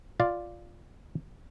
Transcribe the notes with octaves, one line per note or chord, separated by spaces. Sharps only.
F4 D5 F5